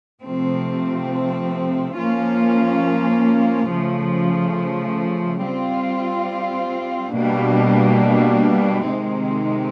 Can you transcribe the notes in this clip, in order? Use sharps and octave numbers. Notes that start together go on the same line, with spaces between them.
C3 F3 A3 C4
F3 A#3 C#4 F4
C#3 F3 A3
G3 C4 F4
B2 G3 A#3 D4
C3 D#3 G#3 C4 D#4